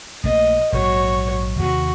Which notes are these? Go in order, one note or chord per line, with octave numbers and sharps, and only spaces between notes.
A#1 A3 A#3 D#5
A#1 G#2 F#3 F#4 C#5
D#2 C3 D#3 F#4